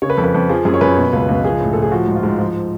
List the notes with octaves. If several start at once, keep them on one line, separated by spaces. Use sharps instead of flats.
C#3 C#5
B4
F2 A4
B4
F2
F3 G#4
F#2 G#4
C#5
F#2 B4
B2
C#2
C#2
F3 G#4
A2
A2 A4
G#4
F3 F#4
G#2
F4
G#2
F3